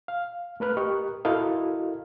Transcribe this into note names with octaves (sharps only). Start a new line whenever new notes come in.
F5
A3 A#4 B4 F6 F#6
G4 A#4 D#5 C#6
E4 F#4 A4 A#4 D#5 F5